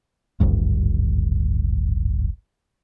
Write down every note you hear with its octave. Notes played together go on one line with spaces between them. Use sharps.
D1 G#1 D2 G2